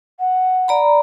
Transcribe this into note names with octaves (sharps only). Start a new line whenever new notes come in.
F#5
D5 A#5 B5